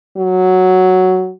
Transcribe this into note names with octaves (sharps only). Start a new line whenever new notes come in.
F#3